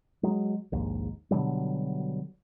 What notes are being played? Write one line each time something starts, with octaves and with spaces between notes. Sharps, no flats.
F#3 G#3
A#1 D#2 G#2
B2 D3 F#3 G3